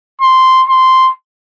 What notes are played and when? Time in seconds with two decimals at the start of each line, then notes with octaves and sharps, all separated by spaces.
0.21 C6
0.69 C6